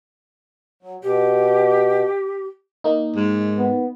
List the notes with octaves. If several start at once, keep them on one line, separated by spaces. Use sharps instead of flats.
F#3
B2 G4
A#3 D#4
G#2
B3